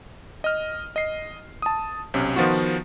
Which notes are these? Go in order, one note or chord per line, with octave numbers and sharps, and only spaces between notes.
D#5 F6
D#5 C7
A5 D#6
B1 C3 C#4
D#3 F3 B3 F4 F#4